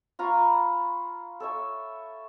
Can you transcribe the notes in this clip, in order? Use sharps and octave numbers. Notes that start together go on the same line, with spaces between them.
F4 A#5 B5 C#6
A4 C#5 E5